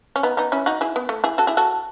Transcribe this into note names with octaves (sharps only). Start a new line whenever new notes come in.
C#4
B3 D#4
B3 D#4
C#4 E4
D#4 F#4
E4 G#4
B3
A3
E4 G#4
F#4 A4
E4 G#4
F#4 A4